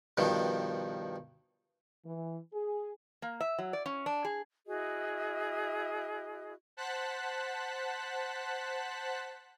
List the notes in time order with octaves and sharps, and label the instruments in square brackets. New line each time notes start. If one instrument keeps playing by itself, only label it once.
[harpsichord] G2 B2 D#3 F3
[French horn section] E3
G#4
[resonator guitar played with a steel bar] A#3
E5
F#3
D5
C#4
D4
G#4
[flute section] E4 F#4 G#4 D#5
[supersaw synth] C5 F#5 A5 F#6 B6